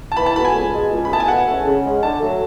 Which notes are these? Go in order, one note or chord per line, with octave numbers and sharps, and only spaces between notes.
A5
E3 B5
A5
B3 F#4 A4 B5
G#5
C#2
B2 G#3
C#2
B5
B2 A3 E4 G#4 A5
G#5
B2 F#5
G#3 C#4 E4 A4
C#3
G#3 C#4
D3 A5
F#3 A3